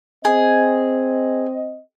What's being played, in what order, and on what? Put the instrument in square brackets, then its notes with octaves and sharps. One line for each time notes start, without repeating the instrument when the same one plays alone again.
[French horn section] C4 D#5 [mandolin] G#4